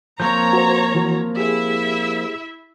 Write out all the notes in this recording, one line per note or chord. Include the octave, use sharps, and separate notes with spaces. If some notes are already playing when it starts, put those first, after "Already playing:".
F3 A#3 C4 C#5 A#5 G6
F#4 B4 C5
E3 F#4
E4 G4 G#4 E5